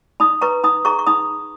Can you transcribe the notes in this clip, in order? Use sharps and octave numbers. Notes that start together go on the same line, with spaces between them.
D#4 B5 D#6
B4 A#5 C#6
D#4 B5 D#6
G#4 A#5 C#6
C#6
D#4 B5 D#6